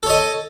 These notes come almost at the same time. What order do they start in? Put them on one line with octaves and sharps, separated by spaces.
A4 C#5 D#5